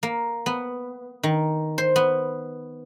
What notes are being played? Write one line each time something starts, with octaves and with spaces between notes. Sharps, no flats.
A#3
B3
D#3
C5
B3